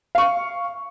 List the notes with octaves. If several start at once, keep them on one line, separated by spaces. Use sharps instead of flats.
F5 C#6